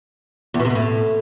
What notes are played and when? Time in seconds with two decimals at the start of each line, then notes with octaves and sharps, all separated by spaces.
0.54 E2
0.59 B2
0.65 C3
0.70 B2
0.75 A2